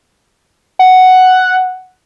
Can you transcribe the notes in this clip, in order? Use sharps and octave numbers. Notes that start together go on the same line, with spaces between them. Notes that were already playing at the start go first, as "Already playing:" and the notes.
F#5